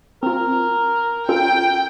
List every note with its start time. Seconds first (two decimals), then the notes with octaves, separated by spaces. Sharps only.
0.23 C4 F4 A#4
1.29 C#4 F4 A4 G5